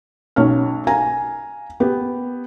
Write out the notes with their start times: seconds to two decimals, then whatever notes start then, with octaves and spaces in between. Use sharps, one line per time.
0.36 B1 C#4 C#5 F6
0.87 F5 G#5 A#5
1.80 B3 G4